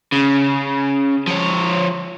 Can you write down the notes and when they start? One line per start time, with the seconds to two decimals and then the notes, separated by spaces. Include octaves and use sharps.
0.12 C#3
1.27 F3 C#5